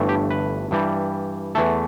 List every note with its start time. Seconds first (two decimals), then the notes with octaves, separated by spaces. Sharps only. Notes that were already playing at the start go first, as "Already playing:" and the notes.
Already playing: G1 G2 E3 A3
0.09 G4
0.31 B4
0.71 G2 E3 G3
1.55 E2 E3 A3 A4